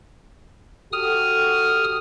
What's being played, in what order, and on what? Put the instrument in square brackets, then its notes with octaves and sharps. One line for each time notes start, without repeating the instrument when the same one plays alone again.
[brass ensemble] F#4 G4 A4 [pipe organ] D#6 F6